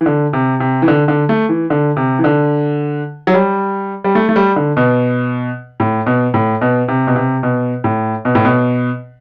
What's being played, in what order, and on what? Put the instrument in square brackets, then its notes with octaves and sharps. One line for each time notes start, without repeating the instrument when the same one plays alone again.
[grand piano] E3
D3
C3
C3
E3
D3
D3
A3
E3
D3
C3
E3
D3
F#3
G3
G3
A3
A3
G3
D3
B2
A2
B2
A2
B2
C3
B2
C3
B2
A2
B2
A2
B2